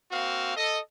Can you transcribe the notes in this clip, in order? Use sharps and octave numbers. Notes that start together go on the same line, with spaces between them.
A#3 C4 F#4 F5
A4 D#5